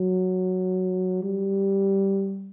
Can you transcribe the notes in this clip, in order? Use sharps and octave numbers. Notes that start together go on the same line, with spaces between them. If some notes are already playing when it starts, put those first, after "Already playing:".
Already playing: F#3
G3